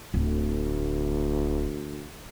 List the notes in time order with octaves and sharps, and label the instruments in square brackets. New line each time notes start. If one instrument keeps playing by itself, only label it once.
[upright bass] D1 [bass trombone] D2